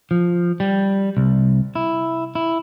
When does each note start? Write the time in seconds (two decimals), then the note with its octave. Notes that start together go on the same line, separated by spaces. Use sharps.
0.11 F3
0.60 G3
1.17 C2
1.76 E4
2.35 E4